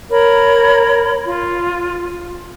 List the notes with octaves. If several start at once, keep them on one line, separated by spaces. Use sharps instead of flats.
A#4 C#5 B5
F4